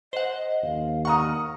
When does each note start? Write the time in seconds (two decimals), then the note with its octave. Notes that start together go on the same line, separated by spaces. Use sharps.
0.13 C5 D#5 F#5
0.63 D#2 F5
1.05 F#5 A#5 C#6 D#6 F6